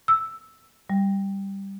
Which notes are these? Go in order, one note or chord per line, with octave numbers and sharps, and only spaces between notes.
E6
G3